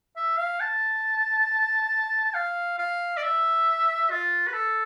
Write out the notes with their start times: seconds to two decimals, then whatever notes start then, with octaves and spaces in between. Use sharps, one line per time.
0.16 E5
0.37 F5
0.60 A5
2.34 F5
2.78 F5
3.17 D5
3.23 E5
4.11 F4
4.47 B4
4.53 A4